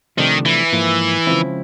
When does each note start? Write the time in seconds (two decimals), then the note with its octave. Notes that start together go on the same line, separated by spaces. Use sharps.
0.17 C2 C3 D#3 F3 A3 D4
0.45 E3
0.72 G#2 F3 A#3
1.27 C#3 F3 G#3 C4 E4